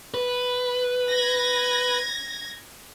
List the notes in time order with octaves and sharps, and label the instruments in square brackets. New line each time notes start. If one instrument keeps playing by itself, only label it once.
[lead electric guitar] B4
[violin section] G#6 A#6